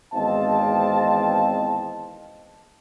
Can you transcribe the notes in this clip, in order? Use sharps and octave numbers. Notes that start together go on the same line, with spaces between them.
G#1 E2 C4 D#5 F5 A5